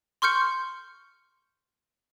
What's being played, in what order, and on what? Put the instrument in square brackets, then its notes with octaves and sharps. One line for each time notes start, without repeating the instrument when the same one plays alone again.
[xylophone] C6 C#6 F6 G6 C#7